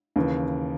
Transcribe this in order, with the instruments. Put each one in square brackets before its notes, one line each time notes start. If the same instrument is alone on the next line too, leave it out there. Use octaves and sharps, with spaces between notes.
[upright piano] D#2 C#3 E3